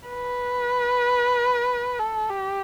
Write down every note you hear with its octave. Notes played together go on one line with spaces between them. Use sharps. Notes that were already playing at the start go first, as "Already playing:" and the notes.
B4
A4
G4